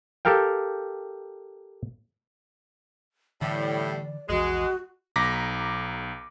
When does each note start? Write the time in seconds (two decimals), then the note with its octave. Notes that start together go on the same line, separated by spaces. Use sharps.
0.25 G4 A4 A#4 F5 G5
3.42 A2 D3 E3 G3 D5
4.29 A#1 E2 E3 G#3 F#4
5.16 B1 A#5 D6 A#6 B6